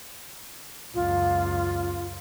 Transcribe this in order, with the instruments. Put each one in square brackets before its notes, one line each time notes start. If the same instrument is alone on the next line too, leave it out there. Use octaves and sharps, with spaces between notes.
[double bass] C#2 F#2 [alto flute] F4